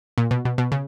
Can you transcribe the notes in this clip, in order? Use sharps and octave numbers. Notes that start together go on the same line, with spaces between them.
A#2
B2
B2
B2
C#3